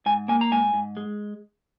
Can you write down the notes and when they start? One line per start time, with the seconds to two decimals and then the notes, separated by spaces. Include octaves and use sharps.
0.06 G#2 G#5
0.28 A#3 G#5
0.41 A#5
0.51 G#2 G#5
0.74 G#2
0.97 G#3